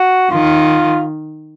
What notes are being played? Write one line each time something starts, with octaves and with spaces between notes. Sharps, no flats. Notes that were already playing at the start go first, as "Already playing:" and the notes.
Already playing: F#4
D#3 F4